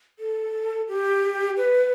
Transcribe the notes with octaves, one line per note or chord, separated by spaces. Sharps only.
A4
G4
B4